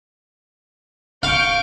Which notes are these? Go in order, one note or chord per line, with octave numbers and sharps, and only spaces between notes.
F5 C#6 G6 D7